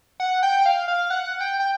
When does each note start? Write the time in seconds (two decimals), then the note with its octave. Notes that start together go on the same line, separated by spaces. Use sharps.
0.20 F#5
0.43 G5
0.66 F5
0.88 F5
1.10 F#5
1.40 G5
1.60 G5